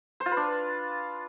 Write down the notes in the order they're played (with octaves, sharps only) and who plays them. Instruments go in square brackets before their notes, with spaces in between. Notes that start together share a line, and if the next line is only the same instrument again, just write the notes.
[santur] C5
F4
B4
D4